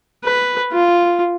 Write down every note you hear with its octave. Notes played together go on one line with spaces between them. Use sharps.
B4
F4